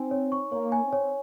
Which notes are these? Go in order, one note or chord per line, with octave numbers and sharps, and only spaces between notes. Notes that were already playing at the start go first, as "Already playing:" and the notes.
Already playing: C4 D#4 G#5
C#5
C#6
A#3 C#5
G#5
C4
C#5